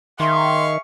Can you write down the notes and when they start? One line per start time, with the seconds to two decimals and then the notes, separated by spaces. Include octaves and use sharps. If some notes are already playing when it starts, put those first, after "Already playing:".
0.20 D#3 G#4 E5 F5 C6 C#6